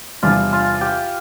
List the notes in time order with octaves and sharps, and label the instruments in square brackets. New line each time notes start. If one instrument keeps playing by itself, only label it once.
[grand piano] E2 C3 G3 D4 [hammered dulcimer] F4
[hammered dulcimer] F4
G4